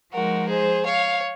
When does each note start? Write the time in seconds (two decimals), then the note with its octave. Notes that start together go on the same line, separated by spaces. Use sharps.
0.12 F3 G#3 D#4 F#4 A#4
0.48 G#4 C5
0.84 C#5 F5